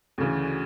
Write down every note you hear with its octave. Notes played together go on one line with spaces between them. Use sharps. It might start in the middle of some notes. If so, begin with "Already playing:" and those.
D2 C#3 E3